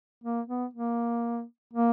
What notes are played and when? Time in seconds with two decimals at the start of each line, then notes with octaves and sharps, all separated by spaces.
0.24 A#3
0.48 B3
0.74 A#3
1.73 A#3